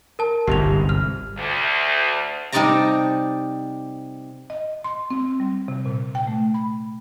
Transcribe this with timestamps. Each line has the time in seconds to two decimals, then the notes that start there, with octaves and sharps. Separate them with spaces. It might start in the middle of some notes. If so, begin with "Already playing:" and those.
0.19 A#4 A5
0.47 G1 C2 G#2 G4 F7
0.89 F6
1.38 D2
2.52 C3 G3 D#4 D5 A5 A#5
4.50 D#5
4.84 C6
5.10 C4
5.40 G3
5.68 C3
5.86 A#2
6.15 G5
6.27 A3
6.54 B5